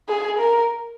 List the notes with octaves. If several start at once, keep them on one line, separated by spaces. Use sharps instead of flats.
G#4
A#4